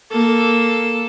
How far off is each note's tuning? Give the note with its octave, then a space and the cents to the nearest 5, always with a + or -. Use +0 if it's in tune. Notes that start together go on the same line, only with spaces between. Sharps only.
A#3 +0 A4 -5